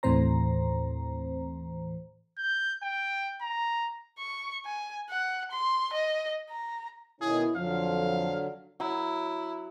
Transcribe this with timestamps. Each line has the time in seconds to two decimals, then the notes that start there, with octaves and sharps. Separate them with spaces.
0.03 D#2 A2 E3 C4 C5 A#5
2.38 G6
2.83 G5
3.41 A#5
4.19 C#6
4.66 G#5
5.10 F#5
5.52 C6
5.94 D#5
6.50 A#5
7.21 B2 D#3 C#4 E4 G#4
7.56 F2 D3 F3 F#3 F5
8.80 F#3 E4